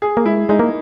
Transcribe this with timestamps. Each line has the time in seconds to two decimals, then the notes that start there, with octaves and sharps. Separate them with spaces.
0.02 G#4
0.17 A#3
0.25 G#3 E4
0.49 G#3 D#4
0.59 A#3